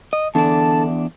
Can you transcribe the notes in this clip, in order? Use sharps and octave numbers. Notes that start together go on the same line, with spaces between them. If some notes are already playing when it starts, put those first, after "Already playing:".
D#5
E2 D3 D4 A5